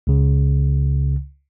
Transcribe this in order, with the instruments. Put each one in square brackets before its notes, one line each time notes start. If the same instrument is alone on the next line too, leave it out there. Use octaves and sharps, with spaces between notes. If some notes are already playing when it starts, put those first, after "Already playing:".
[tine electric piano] C#2 C#3